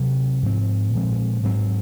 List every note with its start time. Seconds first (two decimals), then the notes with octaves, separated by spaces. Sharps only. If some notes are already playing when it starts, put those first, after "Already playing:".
Already playing: C3 F#3 C4
0.43 G#2 F3 C4
0.92 A#2 F3 G#3 C4
1.43 G#2 F#3 C4